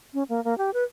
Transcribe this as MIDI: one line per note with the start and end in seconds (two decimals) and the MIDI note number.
0.14 0.23 61
0.29 0.43 58
0.44 0.57 58
0.58 0.70 67
0.74 0.84 71